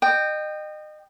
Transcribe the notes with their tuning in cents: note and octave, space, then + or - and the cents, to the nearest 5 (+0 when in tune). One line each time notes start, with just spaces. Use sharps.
D#5 -30 G5 +0